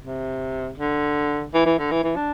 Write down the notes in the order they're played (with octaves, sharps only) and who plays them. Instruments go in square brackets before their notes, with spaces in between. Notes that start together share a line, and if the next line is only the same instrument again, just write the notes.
[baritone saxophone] C3
D3
E3
E3
D3
E3
E3
D4